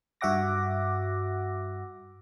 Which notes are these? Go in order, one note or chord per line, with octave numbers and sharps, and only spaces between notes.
G2 F#4 E5 F#5 D6 A#6